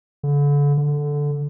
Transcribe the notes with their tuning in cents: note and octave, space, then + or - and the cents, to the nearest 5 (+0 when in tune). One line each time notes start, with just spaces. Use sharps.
D3 -35
D3 -5